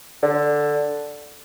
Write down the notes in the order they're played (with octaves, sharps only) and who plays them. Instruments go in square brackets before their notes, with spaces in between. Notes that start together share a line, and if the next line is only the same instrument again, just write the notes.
[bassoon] D3